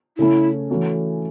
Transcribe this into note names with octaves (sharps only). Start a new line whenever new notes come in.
C#3 A3 C#4 E4
E3 A3 C#4 F#4 A4